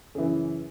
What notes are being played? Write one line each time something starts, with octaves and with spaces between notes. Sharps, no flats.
F#2 C#3 E3 G#4